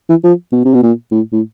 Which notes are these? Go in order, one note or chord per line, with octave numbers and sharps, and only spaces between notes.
E3
F3
B2
C3
B2
A#2
A2
A2